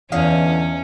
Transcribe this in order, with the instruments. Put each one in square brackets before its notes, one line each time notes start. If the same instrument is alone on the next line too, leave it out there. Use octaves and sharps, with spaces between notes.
[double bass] E2 [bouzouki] D3 D#5 F5 [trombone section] E3 [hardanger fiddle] C#4